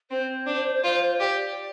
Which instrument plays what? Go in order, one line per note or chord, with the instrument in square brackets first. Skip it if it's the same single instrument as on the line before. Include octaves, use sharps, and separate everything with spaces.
[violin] C4 [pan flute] C5
[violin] D4
F4
[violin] G4 [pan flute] D5